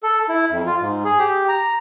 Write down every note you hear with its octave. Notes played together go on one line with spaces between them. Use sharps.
A4
E4
F2
F4
G#2
G#4
G4
A#5